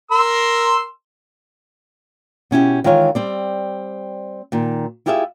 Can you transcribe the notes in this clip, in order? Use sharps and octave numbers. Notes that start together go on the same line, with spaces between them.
A#4 C6 E6
B2 C#4 E4 G4
D#3 E3 G#3 F4 G#4 C#5
G3 C4 D5
A#2 D#3
E4 F4 G4 G#4 D#5 E5